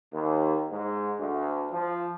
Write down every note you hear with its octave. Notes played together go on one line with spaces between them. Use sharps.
D#2
G#2
D2
F3